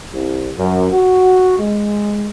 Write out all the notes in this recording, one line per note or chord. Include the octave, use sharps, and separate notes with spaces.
C2
F#2
F#4
G#3